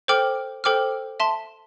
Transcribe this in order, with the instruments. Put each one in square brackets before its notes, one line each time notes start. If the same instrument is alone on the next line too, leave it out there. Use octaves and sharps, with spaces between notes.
[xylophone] A4 C5 G5 D6 F6
A4 C5 G5 D6 F6
E5 A5 C6